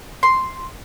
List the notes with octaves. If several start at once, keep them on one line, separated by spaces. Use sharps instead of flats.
C6